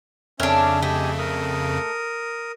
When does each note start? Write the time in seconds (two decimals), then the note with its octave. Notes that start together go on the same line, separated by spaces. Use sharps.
0.40 F2 C#3 C#4 D4 A#4 C#5 E5
0.82 A3 G4 D#5 G#5
1.19 A#4 D#6